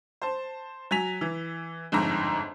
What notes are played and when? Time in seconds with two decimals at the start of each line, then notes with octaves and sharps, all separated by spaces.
0.22 C5 A5
0.91 F#3 G#5 B6 F7
1.21 E3
1.92 G1 F2 G#2 A#5